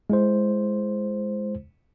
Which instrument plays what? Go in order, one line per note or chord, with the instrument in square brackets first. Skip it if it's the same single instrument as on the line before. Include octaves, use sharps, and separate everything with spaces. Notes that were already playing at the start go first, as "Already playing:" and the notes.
[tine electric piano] G#3 E4 C5